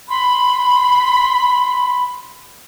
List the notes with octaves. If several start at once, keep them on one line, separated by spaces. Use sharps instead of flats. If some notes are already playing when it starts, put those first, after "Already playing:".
B5 C6